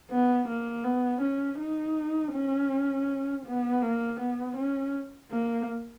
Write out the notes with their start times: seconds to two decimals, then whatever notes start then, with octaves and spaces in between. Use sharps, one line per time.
0.10 B3
0.48 A#3
0.84 B3
1.21 C#4
1.59 D#4
2.33 C#4
3.46 B3
3.82 A#3
4.20 B3
4.57 C#4
5.31 A#3